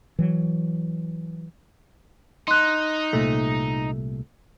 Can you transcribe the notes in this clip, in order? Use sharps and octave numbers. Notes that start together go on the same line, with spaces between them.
E3 F#3
D#4 C6 F#6
C2 A#2 A3